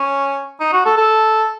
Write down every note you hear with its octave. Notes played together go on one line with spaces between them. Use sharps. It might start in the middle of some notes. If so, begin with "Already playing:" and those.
Already playing: C#4
D#4
F#4
A4
A4